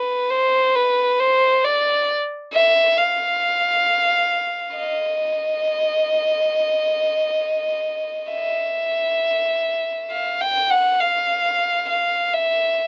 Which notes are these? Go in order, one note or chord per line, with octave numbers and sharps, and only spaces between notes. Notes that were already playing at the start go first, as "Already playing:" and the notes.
Already playing: B4
C5
B4
C5
D5
E5
F5
D#5
E5
F5
G5
F#5
F5
F5
E5